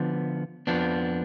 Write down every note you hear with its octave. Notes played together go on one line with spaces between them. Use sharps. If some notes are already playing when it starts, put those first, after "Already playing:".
Already playing: D3 F3 B3
F2 F3 B3 D4